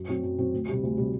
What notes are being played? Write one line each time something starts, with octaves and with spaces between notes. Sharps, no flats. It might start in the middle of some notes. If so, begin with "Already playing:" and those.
Already playing: F#2
F#3 C4 F#4
F#2
F#3 C4 F#4
D2
C3 G3
D2
C3 G3